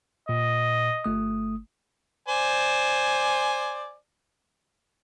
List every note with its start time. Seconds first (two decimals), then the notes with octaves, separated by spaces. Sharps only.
0.29 A#2 D#5
1.04 G1 A3 D#6
2.28 C5 D5 G#5